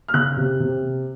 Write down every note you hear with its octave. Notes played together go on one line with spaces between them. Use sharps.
F6
C#3 F#6
C3
C3